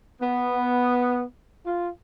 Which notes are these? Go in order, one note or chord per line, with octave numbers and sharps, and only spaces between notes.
B3
F4